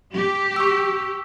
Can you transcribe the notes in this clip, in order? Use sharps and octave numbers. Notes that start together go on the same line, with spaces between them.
G4
C#6 E6